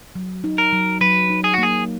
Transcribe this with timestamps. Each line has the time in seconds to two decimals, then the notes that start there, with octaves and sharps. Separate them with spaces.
0.15 F#3
0.44 D#4
0.58 A#4
0.72 F#3
1.01 F#3 B4
1.30 D#4
1.44 G#4
1.54 F#4
1.58 A#3 G#4